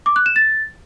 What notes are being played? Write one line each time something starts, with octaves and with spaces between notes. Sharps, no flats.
D6
F#6
E7
A6